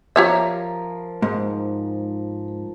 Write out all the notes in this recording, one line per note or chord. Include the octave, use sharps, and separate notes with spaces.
F3 G4 A#4 C#5 E5
G#2